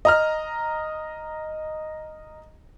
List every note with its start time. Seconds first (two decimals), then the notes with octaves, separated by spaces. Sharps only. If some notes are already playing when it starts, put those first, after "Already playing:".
0.05 D#5 A#5 F6